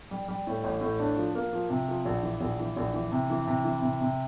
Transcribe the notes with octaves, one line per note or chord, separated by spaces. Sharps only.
G3
G3
A2
A1
A2
D4
F3
A#3
F3
C3
F3
A#1
E3
A#1
E3
A#1
E3
C3
E3
C3
E3
C3
C3